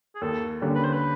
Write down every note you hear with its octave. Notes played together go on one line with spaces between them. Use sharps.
G#4
D#2 A4
D3 G3 A#3 C#4
B4
C5
B4